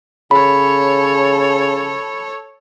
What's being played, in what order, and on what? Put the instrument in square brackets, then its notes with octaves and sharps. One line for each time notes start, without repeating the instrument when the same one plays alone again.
[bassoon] C#3 [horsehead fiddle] A4 C#5 [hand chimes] B5